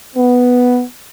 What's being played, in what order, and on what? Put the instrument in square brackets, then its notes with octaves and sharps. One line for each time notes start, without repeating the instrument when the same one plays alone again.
[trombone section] B3